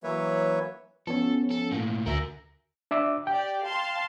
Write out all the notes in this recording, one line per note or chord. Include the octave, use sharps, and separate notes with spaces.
E3 F#3 A#3 B4 C#5 E5
F3 B3 C#4 A4
A4
A2 A#3
D2 F#4 A#4 E5 A#6
D4 E5 D6
G4 D5 G5
F5 A5 C6